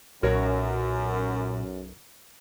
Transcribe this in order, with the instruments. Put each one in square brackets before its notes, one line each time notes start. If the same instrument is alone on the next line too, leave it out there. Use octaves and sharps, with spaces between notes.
[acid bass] B1 [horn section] F#2 [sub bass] A#2 [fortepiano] F#4 A#4 C#5